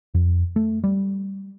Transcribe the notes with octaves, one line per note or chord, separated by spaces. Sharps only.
F2
A3
G3